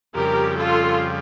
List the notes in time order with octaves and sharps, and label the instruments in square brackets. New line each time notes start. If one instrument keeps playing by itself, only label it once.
[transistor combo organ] F2 C#3 G3 [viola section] G4 A#4
[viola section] F4 A4